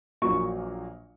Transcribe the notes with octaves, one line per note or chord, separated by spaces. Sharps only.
A#1 A#2 F#3 A#3 C#6